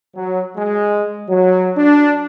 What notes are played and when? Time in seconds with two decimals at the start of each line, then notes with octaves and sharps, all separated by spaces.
0.16 F#3
0.57 G#3
1.29 F#3
1.77 D4